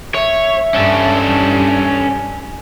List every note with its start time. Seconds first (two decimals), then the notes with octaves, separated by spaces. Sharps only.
0.14 C#5 E5
0.74 G2 C#4 A4
1.85 G#5